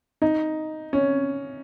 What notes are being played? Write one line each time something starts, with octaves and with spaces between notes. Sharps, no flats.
D#4
C#4